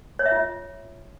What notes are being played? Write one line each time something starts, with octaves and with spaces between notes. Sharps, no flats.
C#5
E5
F4